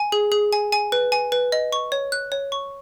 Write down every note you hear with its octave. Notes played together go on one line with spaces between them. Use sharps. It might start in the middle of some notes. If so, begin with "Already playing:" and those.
Already playing: G#5
G#4
G#4
G#5
G#5
B4
G#5
B4
D#5
C#6
C#5
F#6
C#5
C#6